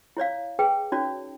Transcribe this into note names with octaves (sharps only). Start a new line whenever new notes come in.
E4 C#5 D5 F5
G#4 B4 G5
C#4 D#4 F#4 C#5 D5